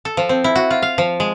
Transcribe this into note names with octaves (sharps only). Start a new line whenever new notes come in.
A4
F3
C4
E4
F#4
F4
F5
F3
G#3